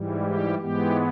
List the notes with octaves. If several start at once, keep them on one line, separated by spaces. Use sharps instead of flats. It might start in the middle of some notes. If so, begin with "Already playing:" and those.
Already playing: G#2 E3 G3
G4
G#2 E3 G#3 B3 G4